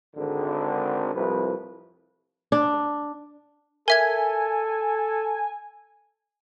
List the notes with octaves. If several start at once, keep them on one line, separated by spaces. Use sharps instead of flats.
G#1 D3
C2 F2 A2 B4
D4
A4 A#4 E5 G#5 G#6